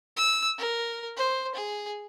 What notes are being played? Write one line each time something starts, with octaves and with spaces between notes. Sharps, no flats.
E6
A#4
C5
G#4